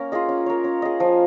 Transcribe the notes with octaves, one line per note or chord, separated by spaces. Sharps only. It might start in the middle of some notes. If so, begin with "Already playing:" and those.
Already playing: A#3 C#4 A#4
F4 G#4 D#5
C#4
A#4 C#5
C#4
G#4 D#5
F3